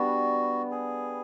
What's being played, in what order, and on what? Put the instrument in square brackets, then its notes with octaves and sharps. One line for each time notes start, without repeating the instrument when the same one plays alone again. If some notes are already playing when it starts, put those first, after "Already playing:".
Already playing: [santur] G3 B3 D4 [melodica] F#4
[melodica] G#4